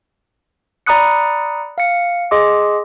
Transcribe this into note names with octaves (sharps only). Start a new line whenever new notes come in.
D5 A#5 B5 D#6 F#6 C#7
F5 C#7
G#4 D#5 C6 D6